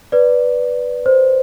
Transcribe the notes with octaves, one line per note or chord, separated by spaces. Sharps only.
B4 D5
C5